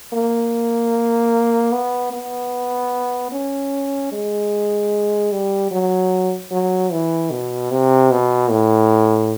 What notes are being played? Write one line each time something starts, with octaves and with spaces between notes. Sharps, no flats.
A#3
B3
B3
C#4
G#3
G3
F#3
F#3
E3
B2
C3
B2
A2